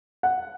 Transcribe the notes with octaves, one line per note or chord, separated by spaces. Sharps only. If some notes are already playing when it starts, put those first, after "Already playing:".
F#5